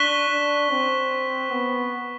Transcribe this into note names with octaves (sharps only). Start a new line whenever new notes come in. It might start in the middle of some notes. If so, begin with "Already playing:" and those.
Already playing: D4 C#6 F#6 B6 E7 G7
D4
C4
B3